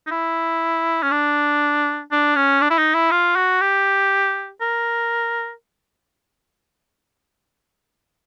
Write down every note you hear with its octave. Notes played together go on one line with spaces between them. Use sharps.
D#4
E4
C#4
D4
D4
C#4
D4
E4
D#4
E4
F4
F#4
G4
A#4